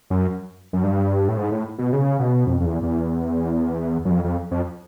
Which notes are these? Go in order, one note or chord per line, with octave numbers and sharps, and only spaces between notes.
F#2
F#2
G2
A2
G#2
A2
B2
C#3
B2
F2
F2
E2
E2
F#2
F2
F2
F2